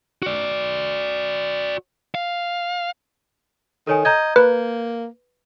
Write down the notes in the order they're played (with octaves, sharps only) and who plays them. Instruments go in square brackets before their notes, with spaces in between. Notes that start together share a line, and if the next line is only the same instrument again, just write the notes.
[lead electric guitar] F#4 D5
F5
[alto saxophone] D#3 [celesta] A4 C#5 G#5
[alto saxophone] D#5 [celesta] A#5 G6 G#6
[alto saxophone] A#3 [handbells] B4